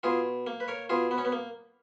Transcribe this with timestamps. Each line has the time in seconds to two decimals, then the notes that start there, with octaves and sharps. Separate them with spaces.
0.03 B2 F4 G#4
0.47 A#3
0.60 B4
0.68 A#4 C#5
0.89 B2 F4 G#4
1.11 B3
1.18 C#4
1.25 B3
1.32 A#3